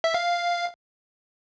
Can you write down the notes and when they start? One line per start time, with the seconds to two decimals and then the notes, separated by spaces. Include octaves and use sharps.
0.04 E5
0.14 F5